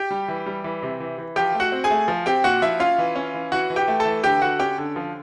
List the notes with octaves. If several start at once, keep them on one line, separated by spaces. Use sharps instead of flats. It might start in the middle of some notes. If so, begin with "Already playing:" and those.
Already playing: G4 G5
G3
E3
G3
E3
C3
E3
E3
F3 G4 G5
A3
F#4 F#5
C4
G#4 G#5
A3
F3
C4 G4 G5
A#2 F#4 F#5
F3 E4 E5
C#4 F4 F5
E3
C#4
E3
E3 F#4 F#5
E3
G4 G5
A3
A4 A5
E3
D3 G4 G5
D3 F#4 F#5
C#4 G4 G5
D3
F3